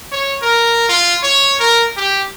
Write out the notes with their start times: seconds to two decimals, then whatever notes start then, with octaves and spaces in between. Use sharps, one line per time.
0.12 C#5
0.42 A#4
0.89 F4
1.23 C#5
1.60 A#4
1.97 G4